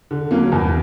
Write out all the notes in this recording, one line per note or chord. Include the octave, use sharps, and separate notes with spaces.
D3
F#3 A#3 C#4
E2